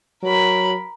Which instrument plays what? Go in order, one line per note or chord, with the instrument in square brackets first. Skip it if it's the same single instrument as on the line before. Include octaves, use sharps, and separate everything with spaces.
[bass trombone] F#3 [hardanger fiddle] A#4 B5